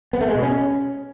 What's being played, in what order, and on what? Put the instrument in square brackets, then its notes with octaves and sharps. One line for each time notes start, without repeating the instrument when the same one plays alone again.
[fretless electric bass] B3
A3
G#3
B2
C#4